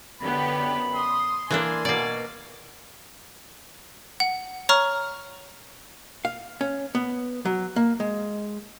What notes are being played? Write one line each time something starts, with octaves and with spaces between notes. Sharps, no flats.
F#2 D3 B3 G4 B5
C6 D#6
E3 A#3 D4 G#5
B2 A#3 D5
F#5
C#5 A#5 C#6 F6
F5
C#4
B3
F#3
A#3
G#3